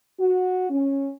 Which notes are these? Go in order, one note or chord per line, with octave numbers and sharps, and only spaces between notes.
F#4
C#4